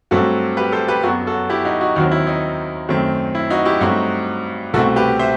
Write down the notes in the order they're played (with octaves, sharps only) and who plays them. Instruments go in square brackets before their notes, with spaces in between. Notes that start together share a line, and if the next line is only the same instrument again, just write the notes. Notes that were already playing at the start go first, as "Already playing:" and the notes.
[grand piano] G2 F#3 A3 C4 F#4 A4
G4 B4
A4 C5
G4 B4
F#2 F#3 B3 F#4 A4
F#4 A4
E4 G4
D#4 F#4
D#4 F#4
D#2 D#3 F#3 C4 D#4 F#4
E4
D#4
F#2 D#3 A3 C4
E4
D#4 F#4
E4 G4
G2 F#3 A3 C4 D#4 F#4
C2 B2 A3 C4 F#4 A4
G4 B4
C5 E5